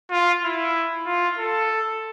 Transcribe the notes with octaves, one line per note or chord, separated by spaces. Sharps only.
F4
E4
F4
A4